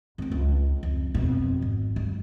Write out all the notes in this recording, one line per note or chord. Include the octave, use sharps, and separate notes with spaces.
F2 A#3
C#2
F2
F2 B2
G#1
G2